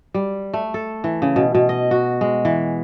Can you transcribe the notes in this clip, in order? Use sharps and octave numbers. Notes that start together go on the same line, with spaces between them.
G3
A3
A4
E3
C#3
B2
B2
D#5
F#4
G#3
E3